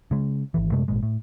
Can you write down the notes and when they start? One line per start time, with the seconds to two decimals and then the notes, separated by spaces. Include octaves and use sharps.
0.11 C#3 G#3
0.54 G#1 E3
0.72 F#2 C3 G#3 A3
0.88 G#1 A#2 G#3
1.03 A2